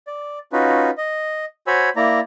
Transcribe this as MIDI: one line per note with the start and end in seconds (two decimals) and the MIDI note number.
0.07 0.39 74
0.53 0.90 61
0.53 0.90 63
0.53 0.90 65
0.53 0.90 66
0.53 0.90 71
0.98 1.45 75
1.67 1.89 66
1.67 1.89 72
1.67 1.89 73
1.67 1.89 80
1.67 1.89 83
1.67 1.89 88
1.96 2.20 58
1.96 2.20 64
1.96 2.20 74
1.96 2.20 82